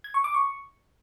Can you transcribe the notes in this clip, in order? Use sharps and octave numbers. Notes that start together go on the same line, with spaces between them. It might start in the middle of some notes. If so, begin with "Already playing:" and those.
G#6
C#6
D6
C#6